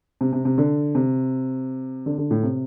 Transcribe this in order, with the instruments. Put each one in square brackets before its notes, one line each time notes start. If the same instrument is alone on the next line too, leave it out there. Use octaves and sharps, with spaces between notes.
[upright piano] C3
C3
C3
D3
C3
D3
D3
A2
C3